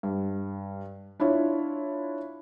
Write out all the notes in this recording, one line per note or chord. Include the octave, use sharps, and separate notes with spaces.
G2
D4 E4 F4 C#5